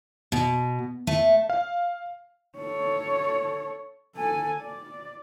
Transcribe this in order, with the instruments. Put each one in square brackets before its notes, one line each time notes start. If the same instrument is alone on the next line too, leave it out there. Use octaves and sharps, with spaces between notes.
[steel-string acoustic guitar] B2
A3
[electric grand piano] F5
[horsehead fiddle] A4 C#5
A4 G#5
D5